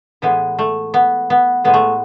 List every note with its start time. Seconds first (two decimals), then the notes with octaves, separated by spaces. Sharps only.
0.22 A2 E3 G#3 B3
0.59 A3
0.94 B3
1.30 B3
1.64 A2 G#3 B3
1.74 A3